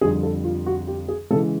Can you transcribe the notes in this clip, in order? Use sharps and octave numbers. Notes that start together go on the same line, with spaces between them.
F2 D3 G3 G#4
A4
F4
F#4
G4
G#4
C#3 E3 G#3 A4